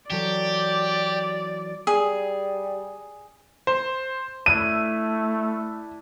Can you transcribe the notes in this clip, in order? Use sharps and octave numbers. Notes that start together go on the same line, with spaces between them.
E3 F#3 G4 A4 D5
G3 G#4
C5
A3 D4 E4 D#7